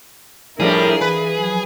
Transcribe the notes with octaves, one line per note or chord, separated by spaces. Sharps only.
A2 F3 G3 D4 E4 G#4 A#4
E3 B4
F3 F#3